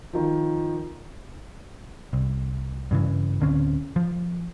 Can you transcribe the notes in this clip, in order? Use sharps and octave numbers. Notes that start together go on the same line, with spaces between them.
D#3 F3
C2
G2 C#3 E3
D1 D3 C4 C#4
F3